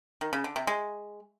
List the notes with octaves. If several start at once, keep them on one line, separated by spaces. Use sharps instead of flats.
D#3
C#3
D3
C3
G#3